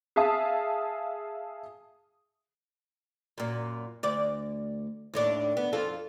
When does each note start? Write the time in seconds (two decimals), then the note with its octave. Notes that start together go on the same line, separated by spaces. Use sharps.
0.16 G#4 E5 F5 A5 D#6
3.38 F#2 A#2
4.03 D2 D5
5.14 D#2 A2 D4
5.57 B3
5.73 F2 F4 A4